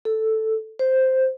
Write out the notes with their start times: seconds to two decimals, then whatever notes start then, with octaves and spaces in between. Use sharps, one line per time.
0.05 A4
0.79 C5